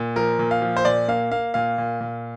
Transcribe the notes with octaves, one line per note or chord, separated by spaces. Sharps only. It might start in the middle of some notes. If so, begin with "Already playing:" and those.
Already playing: A#2
F3 A#4
A#2
F5
F3
C5
A#2 D5
A#3 F5
A#3 F5
A#2 F5
A#2
A#2